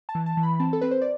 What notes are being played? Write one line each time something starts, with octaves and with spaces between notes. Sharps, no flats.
A5
E3
A5
E3
B5
C4 A5
A4
C4 B4
C5
D5